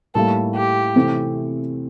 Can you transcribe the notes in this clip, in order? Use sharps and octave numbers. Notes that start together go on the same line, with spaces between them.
A2 G3 A#3 A4
G4
C3 E3 A3 C4